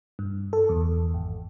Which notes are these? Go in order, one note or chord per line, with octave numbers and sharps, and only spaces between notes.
G2
A4
E2
G#1